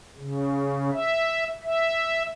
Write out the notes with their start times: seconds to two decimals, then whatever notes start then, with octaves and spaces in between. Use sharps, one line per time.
0.18 C#3
0.93 E5
1.63 E5